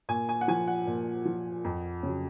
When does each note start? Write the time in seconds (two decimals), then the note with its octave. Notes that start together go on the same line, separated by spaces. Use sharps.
0.09 A#2 G#5
0.29 G#5
0.41 F#5
0.48 F3 G#5
0.68 F#5
0.87 A#2
1.25 F3
1.65 F2
2.03 C#3 F#3